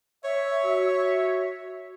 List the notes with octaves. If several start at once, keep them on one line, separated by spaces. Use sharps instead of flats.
C#5 E5
F#4 E5